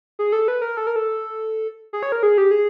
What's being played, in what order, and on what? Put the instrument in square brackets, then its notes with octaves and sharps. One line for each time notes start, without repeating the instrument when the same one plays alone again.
[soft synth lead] G#4
A4
B4
A#4
A4
A#4
A4
G#4
C#5
A#4
G#4
G4
G#4